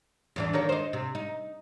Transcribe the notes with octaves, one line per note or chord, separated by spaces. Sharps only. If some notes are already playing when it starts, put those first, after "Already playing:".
E2 E3 D4
D#3 A#3 C#5
D#4 C5
C3
D#4